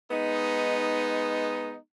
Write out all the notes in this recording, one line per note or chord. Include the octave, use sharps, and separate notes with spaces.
G#3 B3 D#4